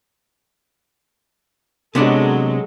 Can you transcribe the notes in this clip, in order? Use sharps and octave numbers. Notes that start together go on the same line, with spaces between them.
C3 F#3 G#3 B3 D4 A4